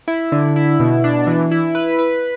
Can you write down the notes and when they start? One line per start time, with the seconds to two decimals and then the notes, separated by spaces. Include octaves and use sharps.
0.08 E4
0.32 D3
0.56 E4
0.80 B2
1.04 D4
1.27 E3
1.51 E4
1.75 B4
1.99 B4